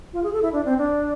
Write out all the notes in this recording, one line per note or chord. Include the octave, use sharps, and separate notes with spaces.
F4
G#4
A4
E4
D4
C4
D4